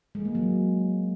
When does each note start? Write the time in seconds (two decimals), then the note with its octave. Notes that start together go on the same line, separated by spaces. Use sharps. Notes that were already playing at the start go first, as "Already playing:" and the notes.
0.15 G#3
0.25 A#3
0.35 F#3